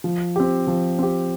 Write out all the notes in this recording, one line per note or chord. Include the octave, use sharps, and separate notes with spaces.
F3
C4 G4
F3
C4 G4